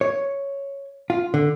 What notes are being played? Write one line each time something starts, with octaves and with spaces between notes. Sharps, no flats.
C#5
F4
D3